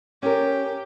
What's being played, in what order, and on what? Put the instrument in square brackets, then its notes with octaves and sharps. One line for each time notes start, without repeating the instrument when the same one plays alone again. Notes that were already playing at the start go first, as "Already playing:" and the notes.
[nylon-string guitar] C#4 A#4 [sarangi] G4